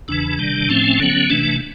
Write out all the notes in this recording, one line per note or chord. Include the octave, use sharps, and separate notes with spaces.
E2 C#3 E3 D4
C3 D#3 G3
A2 F3 A3 C4 C#4
D3 F#3 B3
C3 E3 A3 D4